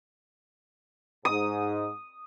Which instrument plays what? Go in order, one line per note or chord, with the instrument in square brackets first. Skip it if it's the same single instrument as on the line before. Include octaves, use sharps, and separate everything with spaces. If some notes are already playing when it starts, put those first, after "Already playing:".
[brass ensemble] G#2 [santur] D#6